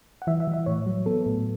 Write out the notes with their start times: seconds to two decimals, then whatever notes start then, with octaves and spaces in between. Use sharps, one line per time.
0.22 F#5
0.27 E3 E5
0.40 E5
0.47 E3
0.54 E5
0.66 A2 C#5
0.86 F#3
1.06 B3 A4
1.26 A2